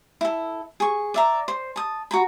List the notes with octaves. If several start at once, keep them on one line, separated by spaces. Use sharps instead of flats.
E4 A4
G#4 C#6
D5 E5 A#5
C5
A5 D#6
F#4 A#5 B5